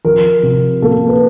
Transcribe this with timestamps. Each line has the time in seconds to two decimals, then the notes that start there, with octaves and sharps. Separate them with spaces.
0.05 F3 A#4
0.43 C3
0.82 A#3 A4
1.08 B4